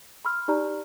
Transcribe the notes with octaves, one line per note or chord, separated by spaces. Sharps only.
B5 C6 E6 F6
D#4 G4 D5 A#5 F6